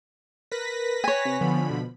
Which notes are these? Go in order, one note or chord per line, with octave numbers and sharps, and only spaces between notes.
A#4 B4 A#6 B6
C#5 G#5
C3
D3 F3 B3 B5
B2